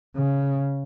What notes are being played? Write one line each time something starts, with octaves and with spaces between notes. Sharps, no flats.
C#3